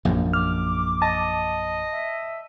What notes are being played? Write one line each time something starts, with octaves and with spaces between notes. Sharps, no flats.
A#1 F#2
D6 F6
D#5 A5
E5